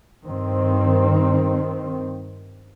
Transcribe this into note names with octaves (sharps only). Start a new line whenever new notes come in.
G2 D#3 C4